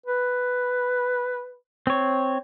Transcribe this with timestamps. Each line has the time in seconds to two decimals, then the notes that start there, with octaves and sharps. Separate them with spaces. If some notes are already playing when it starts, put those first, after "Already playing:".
0.06 B4
1.87 C4 C#5